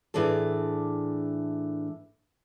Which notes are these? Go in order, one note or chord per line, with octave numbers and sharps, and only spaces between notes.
A2 E3 D4 G#4 A4